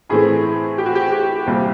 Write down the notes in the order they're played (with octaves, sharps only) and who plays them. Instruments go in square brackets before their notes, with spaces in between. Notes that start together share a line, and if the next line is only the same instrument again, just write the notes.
[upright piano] A2 E3 A3 C4 G#4
G4
F#4
G4
G4
C2 A#2 G3 C4